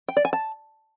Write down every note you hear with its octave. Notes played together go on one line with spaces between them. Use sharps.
G5
D5
G#5
A5